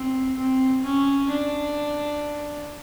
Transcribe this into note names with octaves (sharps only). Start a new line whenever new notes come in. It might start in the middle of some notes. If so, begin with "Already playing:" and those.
Already playing: C4
C4
C#4
D4